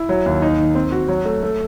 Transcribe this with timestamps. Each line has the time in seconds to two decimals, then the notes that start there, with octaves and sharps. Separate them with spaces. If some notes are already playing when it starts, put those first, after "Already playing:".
Already playing: E4
0.09 F#3
0.26 D#2
0.42 D#4
0.58 D#3
0.75 C4
0.92 F#4
1.08 F#3
1.25 A3
1.43 A3